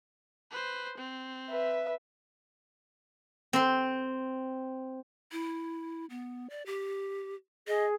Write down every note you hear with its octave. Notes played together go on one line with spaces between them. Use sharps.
B4 C5
C4
B4 E5
C4 C6
E4
B3
D5
G4
G#4 D#5